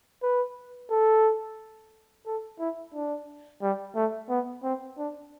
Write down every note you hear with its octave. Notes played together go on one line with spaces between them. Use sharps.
B4
A4
A4
E4
D4
G3
A3
B3
C4
D4